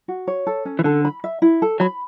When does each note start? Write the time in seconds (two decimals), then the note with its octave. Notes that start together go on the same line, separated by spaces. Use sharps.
0.08 F#4
0.27 C#5
0.47 A4
0.65 C#4
0.79 E3
0.84 D3 A4
1.05 B5
1.24 E5
1.42 E4
1.62 A4
1.80 F#3 B5